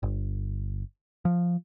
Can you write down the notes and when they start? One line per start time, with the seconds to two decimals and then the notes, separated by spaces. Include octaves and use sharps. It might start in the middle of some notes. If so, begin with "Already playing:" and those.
0.03 G1
1.25 F3